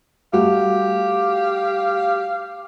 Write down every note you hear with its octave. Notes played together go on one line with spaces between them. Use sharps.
G3 A3 F#4 G4 F5